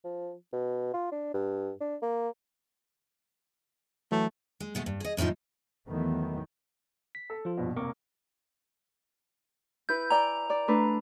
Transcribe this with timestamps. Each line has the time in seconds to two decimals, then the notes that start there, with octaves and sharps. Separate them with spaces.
0.04 F3
0.53 B2
0.94 F4
1.12 D4
1.34 G2
1.81 D4
2.02 A#3
4.12 E3 F#3 A3
4.60 G#3
4.75 B2 G#3 A3
4.86 G2
5.00 G#4 D#5
5.17 F#2 A2 E3 F3 D#4
5.87 E2 D#3 E3 F#3 A3 B3
7.15 B6
7.30 A4
7.45 F3 F4
7.57 A#1 G2 B2
7.76 F1 A#3 A#4 C#6 D6
9.89 E4 B4 G6
10.11 D5 G5 G#5 A#5
10.50 D5
10.68 A3 D4 B4